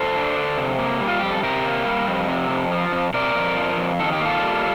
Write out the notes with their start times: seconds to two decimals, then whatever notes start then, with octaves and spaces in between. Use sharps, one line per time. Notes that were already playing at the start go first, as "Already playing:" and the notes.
Already playing: D3 A4 C5
0.15 D4
0.36 D3
0.58 C3
0.78 A#3
1.00 G3
1.08 F4
1.20 F2 G4
1.31 A4
1.42 C3 G4 A#4
1.64 A#3
1.86 G3
2.07 F2
2.28 C3
2.50 F2
2.71 F3
2.92 F2
3.14 C3 A#4 D5
3.35 F2
3.56 F3
3.78 F2
3.99 D#3 A4
4.13 G4
4.21 A#3 F4 A4
4.42 G3